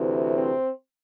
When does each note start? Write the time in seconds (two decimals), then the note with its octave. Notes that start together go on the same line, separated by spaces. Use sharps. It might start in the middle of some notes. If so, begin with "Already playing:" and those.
Already playing: D2 C3 E3
0.32 C4